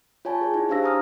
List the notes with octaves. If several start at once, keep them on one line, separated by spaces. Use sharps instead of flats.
F4 C#5 G#5 A5
G#4 C#5
D#4 E4
D4 G4 C5 F5 E6 A#6
G#5 A#5 D#6 F6